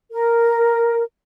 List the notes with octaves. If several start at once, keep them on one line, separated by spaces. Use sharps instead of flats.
A#4